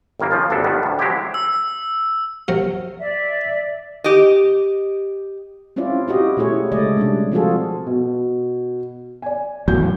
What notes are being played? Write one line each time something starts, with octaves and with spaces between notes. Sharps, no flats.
G1 D#3 E3 A#3
C#3 F3 F4 A5
G1 D2 D4 A4
G2 D#3 G3 B3
D2 A2
F3 F#3 G#3 C4 E4 G4
E6
C3 F#3 A#4
D5 E5
G4 D#5
C4 C#4 E4 F4 D5
E4 F#4 G4 D#5
B2 A3 E4 G#4 C#5
C#3 G#3 A3 D5 D#5
C3 G3 D4
F3 C4 F4 F#4 G#4 A4
B2
D5 G#5
E2 A2 F#3 G6